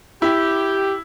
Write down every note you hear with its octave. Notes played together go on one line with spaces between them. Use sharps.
E4 G4